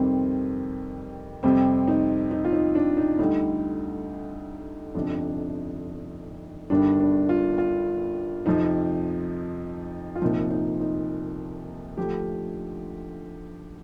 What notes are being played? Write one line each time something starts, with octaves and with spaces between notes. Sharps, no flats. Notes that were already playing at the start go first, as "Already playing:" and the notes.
Already playing: F2 C3 D#3 G3 C4
F2 C3 G3 C4
D#4
D#4
F4
D#4
D4
D#4
D2 D3 G3 D#4
G1 F2 C3 F3 D4
G1 G2 D#3 G3 D4
D4
F4
F4
F2 C3 F3 D#4
F4
C2 A#2 F3 D#4
D#4
D#4
D2 D3 F3 G4